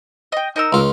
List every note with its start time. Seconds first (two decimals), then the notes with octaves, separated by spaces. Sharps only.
0.32 D#5 G5
0.56 D#4 A#4 E6
0.73 C#2 F4